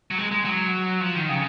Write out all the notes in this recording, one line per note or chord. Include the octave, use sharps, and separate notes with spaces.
F#3
G#3
G#3
F#3
F3
D#3
C#3